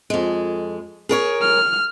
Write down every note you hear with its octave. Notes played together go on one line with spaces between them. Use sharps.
F2 G#3
G#4 A#4 C#5
F6